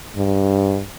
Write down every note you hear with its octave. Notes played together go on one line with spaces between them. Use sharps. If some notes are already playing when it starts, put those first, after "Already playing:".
G2